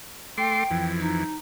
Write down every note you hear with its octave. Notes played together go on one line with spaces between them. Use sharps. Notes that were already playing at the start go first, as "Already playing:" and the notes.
A3 G5 C6 D6
F2 E3
D#4